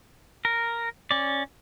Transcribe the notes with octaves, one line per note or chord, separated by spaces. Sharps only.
A#4
C#4 D5